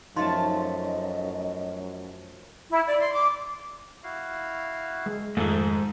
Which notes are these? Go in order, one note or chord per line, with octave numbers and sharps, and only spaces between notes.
F#2 F3 A3 D#4 D#5 A5 C6
E4
D5
C6
D6
E4 F#4 F5
G#3
F2 G#2 D#3 F3 A3 D#4 A4